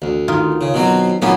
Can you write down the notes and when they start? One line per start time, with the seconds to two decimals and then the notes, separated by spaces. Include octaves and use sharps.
0.02 D2
0.28 D#3 D#4 F4
0.61 C#3
0.74 B2 F#3 C4
1.22 A#2 F#3 A#3 B3 C#4 D#4